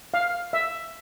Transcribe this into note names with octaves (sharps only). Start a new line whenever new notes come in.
F5
E5